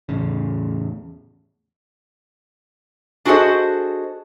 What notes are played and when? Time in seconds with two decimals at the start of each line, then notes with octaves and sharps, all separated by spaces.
0.09 E2 A2 C#3
3.25 D4 F#4 G#4 A4 C5 D#5